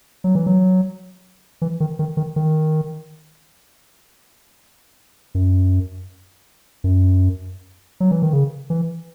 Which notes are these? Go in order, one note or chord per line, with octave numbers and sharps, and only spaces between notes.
F#3
E3
F#3
E3
D#3
D#3
D#3
D#3
F#2
F#2
F#3
E3
D#3
C#3
E3